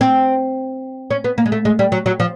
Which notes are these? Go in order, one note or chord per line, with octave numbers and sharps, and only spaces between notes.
C4
C#4
B3
A#3
G#3
A3
G#3
G3
F#3
F#3
F3